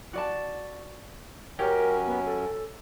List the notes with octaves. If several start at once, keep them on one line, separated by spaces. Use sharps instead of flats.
F#4 D5 A5
F#2 F#3 C#4 G4 A#4 C#5
B3
A4